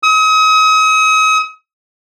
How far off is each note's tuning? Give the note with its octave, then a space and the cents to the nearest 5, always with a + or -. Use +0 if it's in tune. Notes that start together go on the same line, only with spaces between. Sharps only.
D#6 +40